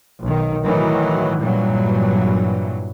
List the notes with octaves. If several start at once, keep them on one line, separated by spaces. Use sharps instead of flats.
B1 D#3
A2 D#3 E3 F#3
G2 A#2 E3 F#3